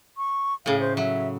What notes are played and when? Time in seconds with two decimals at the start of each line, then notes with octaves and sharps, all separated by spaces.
0.17 C#6
0.66 A2 C#3 F5
0.80 C5
0.97 F#3 E5